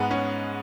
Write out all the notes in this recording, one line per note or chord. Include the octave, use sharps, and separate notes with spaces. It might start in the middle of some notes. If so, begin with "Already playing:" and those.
Already playing: G#2 G#3 B3
C#4